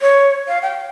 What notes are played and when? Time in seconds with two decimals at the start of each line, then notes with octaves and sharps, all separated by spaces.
0.01 C#5
0.48 F5
0.62 G5